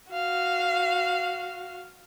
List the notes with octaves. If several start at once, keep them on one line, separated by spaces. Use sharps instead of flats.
F#4 F5